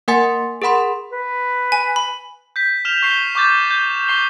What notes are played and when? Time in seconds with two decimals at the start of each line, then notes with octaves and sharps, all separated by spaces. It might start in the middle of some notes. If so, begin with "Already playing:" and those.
0.08 A#3 A#4 F#5 G#5 C6 A6
0.62 G#4 A#4 F#5 B5 C6
1.12 B4
1.72 G#5
1.96 B5
2.56 G6 B6
2.85 F6 E7 F7
3.02 C#6 C7 E7 G7
3.35 C#6 D6 G6 A6
3.71 G6
4.08 C#6 C7 G7